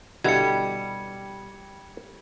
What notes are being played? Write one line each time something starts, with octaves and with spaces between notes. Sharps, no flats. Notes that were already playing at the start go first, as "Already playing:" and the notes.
B2 D3 G3 E4 G#6 C#7